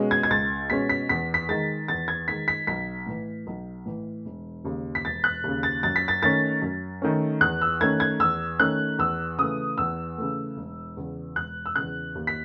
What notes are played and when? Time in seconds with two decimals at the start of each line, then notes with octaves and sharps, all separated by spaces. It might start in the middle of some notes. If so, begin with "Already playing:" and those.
Already playing: B2 G#3 C#4
0.11 G#6
0.23 G#6
0.30 C#2 A6
0.70 B2 G#3 C#4 B6
0.89 B6
1.09 E2 B6
1.34 B6
1.49 D#3 G#3 A6
1.88 E2 A6
2.08 G#6
2.28 D#3 G#3 B6
2.48 B6
2.67 B1 B6
3.07 A2 E3
3.47 B1
3.86 A2 E3
4.25 E1
4.64 D#2 C#3
4.95 B6
5.05 E1 A6
5.24 F#6
5.44 D#2 C#3
5.63 A6
5.83 F#2 A6
5.96 B6
6.08 A6
6.22 D#3 A3 C#4 A6
6.62 F#2
7.02 D#3 A3 C#4
7.41 E2 F#6
7.62 E6
7.81 D#3 A3 C#4 G#6
8.00 G#6
8.20 E2 E6
8.60 D#3 A3 C#4 F#6
8.99 E2 E6
9.39 C#3 E3 A3 D#6
9.78 E2 E6
10.18 C#3 E3 A3
10.57 E1
10.97 E2 C#3
11.36 E1 F#6
11.66 E6
11.76 E2 C#3 F#6
12.15 D#2
12.27 B6